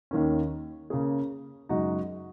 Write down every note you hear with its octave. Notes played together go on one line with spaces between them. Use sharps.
D#2 D#3 A#3 C#4
C#3 A#3 C#4 G#4
F#2 C#3 G#3 D#4 F#4